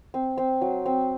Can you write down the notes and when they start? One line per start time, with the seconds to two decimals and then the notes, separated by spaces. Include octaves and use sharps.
0.14 C4
0.37 C4
0.61 F#3
0.86 C4